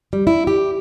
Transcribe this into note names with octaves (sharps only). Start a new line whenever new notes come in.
G3
E4
G4